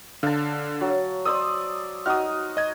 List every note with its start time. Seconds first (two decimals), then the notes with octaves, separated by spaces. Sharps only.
0.23 D3 F5 A5
0.81 F#3
1.25 C5 D5 D#6 E6
2.06 D#4 F#4 D#6 F6
2.57 D#5 G#6